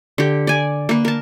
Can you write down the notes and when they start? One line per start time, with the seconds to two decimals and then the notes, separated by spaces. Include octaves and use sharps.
0.18 D3 G4
0.47 D5 G#5
0.89 A#3 B4
1.05 A#4 A5